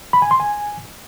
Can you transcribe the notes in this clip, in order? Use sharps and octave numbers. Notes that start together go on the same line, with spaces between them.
B5
G#5
C6
G#5